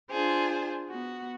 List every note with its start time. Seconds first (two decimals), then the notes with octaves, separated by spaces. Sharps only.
0.11 D4 F4 G#4 C5
0.89 B3 F#4